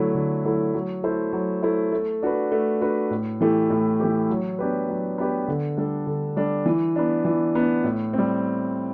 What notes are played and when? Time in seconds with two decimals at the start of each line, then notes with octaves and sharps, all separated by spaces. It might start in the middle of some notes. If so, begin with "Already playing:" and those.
Already playing: D3 F#3 A3 E4
0.15 D3
0.45 F#3 A3 E4
0.74 F#3
1.04 A3 E4 A4 C5
1.33 F#3
1.63 A3 E4 A4 C5
1.92 A3
2.22 D4 F#4 B4
2.52 A3
2.81 D4 F#4 B4
3.11 A2
3.41 E3 A3 E4 G4
3.70 A2
4.00 E3 A3 E4 G4
4.30 F#3
4.59 B3 D4 G4 B4
4.89 F#3
5.18 B3 D4 G4 B4
5.48 D3
5.77 G3 D4 A4
6.07 D3
6.36 G3 D4 A4
6.66 E3
6.96 B3 D4
7.25 E3
7.55 B3 D4
7.84 A2
8.13 G3 C4